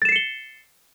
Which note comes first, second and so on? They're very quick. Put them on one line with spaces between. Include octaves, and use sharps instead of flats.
A6 E7 C7 C#7 G7